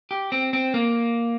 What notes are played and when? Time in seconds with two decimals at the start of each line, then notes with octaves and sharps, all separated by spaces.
0.11 G4
0.32 C4
0.53 C4
0.74 A#3